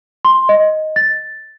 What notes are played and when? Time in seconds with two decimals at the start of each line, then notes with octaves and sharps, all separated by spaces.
0.25 C6
0.49 D#5
0.96 A6